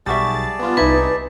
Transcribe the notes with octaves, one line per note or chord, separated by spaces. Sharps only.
B1 G3 F#4 G#4 D5 E5 A5 A6
B3 F4
C2 D#4 E4 B4